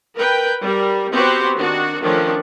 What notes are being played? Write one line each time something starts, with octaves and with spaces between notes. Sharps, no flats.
A#4 B4 G5
G3 A#4
B3 C4 F#4 G4 B4 C5
D#3 D4 F#4
D#3 F3 A3 C#4 D4